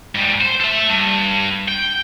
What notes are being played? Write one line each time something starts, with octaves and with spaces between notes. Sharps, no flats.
G#2 G3
C5
A4 E5
G2
G5